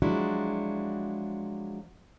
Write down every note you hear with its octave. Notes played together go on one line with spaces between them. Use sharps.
F3 F#3 G#3 D4 E4 F#4